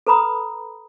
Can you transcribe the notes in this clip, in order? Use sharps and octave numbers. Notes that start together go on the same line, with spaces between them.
A4 B4 A#5 B5 D#6